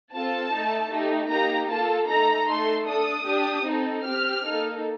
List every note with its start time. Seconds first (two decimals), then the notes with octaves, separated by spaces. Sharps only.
0.13 C4 F4 A4 A5
0.53 A3 D#4 A4
0.92 A3 D#4 G4
1.31 A#3 D#4 G4 A#5
1.70 A#3 F4 A4 A5
2.09 A3 D#4 A4 A#5
2.48 A3 D#4 A4 C6
2.87 D4 A4 D#6
3.27 D4 G4
3.66 C4 D#4 A4
4.05 C4 G4 F6
4.45 A#3 D#4 A4